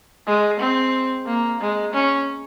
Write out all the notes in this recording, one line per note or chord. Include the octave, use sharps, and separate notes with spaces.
G#3
C4
A#3
G#3
C#4